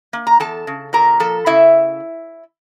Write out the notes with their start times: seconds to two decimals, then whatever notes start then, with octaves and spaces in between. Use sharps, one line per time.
0.13 A#3
0.27 A#5
0.40 E2 A4 A5
0.67 C#3
0.93 A#2 A#4 A#5
1.20 F3 A4 A5
1.46 C#3 E4 E5